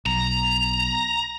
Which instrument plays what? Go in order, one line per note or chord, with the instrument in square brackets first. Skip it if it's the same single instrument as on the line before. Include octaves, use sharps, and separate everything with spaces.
[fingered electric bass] B1 [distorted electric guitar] A#5